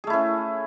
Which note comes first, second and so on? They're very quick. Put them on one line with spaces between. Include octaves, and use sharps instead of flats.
G#4 A3 E4 C#4